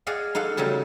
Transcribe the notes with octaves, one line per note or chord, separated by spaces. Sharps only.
G#4 D5 D#5 F5 F#5
D#4 A4 F5 F#5
C#3 F#3 G3 A3 D#4